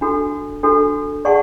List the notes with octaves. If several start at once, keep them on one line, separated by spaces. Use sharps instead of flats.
D4 F#4 A4
D4 F#4 A4
G#4 D5 F#5 A5 C#6